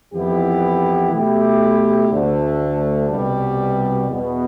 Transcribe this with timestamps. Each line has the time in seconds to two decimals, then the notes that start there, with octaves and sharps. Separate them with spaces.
0.12 F2 E3 B3 E4 G4
1.10 B2 A3 E4 G4
2.09 D2 D3 A3
3.08 C2 B2 G3
4.06 E2 B2 B3